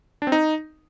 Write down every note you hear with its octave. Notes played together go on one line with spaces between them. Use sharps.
D4
C4
D#4